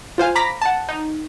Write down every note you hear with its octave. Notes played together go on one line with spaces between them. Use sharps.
F4 C5 F5 G#5
A#5 B5 D6 A#6 B6
F#5 A5
D#4